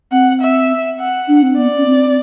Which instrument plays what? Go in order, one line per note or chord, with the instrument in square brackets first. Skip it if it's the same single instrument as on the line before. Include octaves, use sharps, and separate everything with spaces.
[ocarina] C4 [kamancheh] F#5
[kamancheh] E5
F#5
[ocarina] D4
C4
[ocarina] B3 [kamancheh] D5
[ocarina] C#4
C4